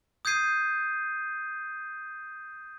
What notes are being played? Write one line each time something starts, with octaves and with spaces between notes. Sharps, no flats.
D#6 G6 G#6 C7 D#7